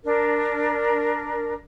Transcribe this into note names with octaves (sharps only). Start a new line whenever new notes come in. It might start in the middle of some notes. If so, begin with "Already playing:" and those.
D4 A#4